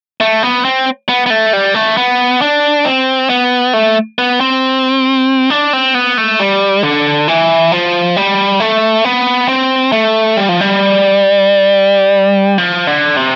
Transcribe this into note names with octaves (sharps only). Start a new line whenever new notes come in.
A3
B3
C4
B3
B3
A3
G3
A3
B3
D4
C4
B3
A3
B3
C4
D4
C4
B3
A3
G3
D3
E3
F3
G3
A3
B3
C4
A3
G3
F3
G3
F3
D3
C3